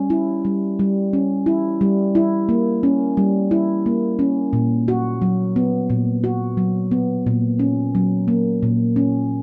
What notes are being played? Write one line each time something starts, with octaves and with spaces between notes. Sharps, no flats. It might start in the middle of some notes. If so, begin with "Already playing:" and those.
Already playing: G3 C#4
E4
G3
G3
C#4
E4
G3
E4
A#3
C#4
G3
E4
A#3
C#4
A#2
F#4
F#3
B3
A#2
F#4
F#3
B3
A#2
C#4
F#3
A#3
A#2
C#4